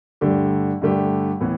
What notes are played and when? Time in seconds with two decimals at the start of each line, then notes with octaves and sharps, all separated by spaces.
0.21 G2 D3 A3 G4
0.81 G2 D3 A3 G4
1.41 A2 E3 B3